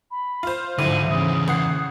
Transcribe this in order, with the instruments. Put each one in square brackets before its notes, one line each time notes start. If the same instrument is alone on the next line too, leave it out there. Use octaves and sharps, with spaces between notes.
[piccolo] B5
[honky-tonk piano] F4 C5
[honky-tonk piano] D2 E4 [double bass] G#2 F3 [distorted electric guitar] D3 [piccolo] D#7
[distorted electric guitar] E2 [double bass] C#3 [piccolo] D#6
[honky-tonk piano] A1 F#5 C7 [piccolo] D#6